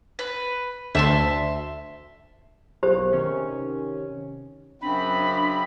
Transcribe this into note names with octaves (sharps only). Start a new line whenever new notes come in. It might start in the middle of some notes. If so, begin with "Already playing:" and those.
B4
D2 E5 A5 C6
B1 A#3 G4 C5
C3 D#3 C#4
F#2 C#3 C4 D4 B5